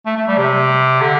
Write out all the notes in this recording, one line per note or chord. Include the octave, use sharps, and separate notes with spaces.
A3
A3
G3
C3
D3